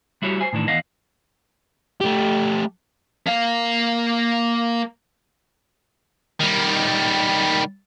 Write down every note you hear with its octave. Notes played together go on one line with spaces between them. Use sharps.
G3 E4 F#4 G4 C#5
C5 G#5
A2 D#3 E3 D4
E2 D#5 F5 F#5
A3 G4
A#3 F5
D#3 G3